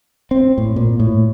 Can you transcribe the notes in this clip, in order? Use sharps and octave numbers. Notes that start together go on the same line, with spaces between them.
C4
A2
A#2
A2